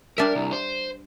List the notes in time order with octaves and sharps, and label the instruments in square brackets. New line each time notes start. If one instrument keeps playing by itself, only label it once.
[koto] G3 D4 E5 [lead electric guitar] A#4
[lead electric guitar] C2
C5